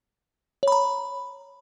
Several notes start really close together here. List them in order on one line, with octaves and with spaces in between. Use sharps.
C#5 B5 A#5